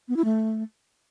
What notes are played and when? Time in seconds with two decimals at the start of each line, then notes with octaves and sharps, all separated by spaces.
0.09 B3
0.17 E4
0.25 A3